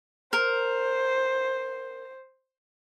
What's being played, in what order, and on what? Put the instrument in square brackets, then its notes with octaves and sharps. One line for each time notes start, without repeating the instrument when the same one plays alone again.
[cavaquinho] A#4 [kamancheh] C5